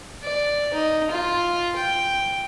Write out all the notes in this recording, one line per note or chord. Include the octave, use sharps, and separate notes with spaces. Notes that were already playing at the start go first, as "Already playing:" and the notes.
D5
D#4
F4
G5